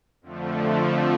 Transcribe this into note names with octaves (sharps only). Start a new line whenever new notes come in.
F2 D3 F3 A3